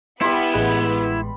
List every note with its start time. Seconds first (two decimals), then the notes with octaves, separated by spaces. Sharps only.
0.21 G3 B3 E4 B5 C6
0.54 A1 G#3 B4